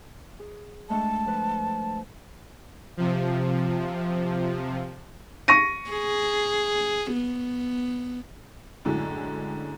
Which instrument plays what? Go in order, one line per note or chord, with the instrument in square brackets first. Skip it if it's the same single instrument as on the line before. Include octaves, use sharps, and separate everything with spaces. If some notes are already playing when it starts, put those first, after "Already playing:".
[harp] G#4
[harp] G#3 A3 D4 [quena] A5
[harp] F3 B4
[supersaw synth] C3 F3
[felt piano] C#6 A#6 D#7
[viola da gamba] G#4
B3
[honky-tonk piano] F#2 A2 D3 G#3